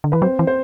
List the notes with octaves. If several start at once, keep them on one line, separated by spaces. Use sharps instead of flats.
D3
E3 B4
F#3 C4 C5
E3
C5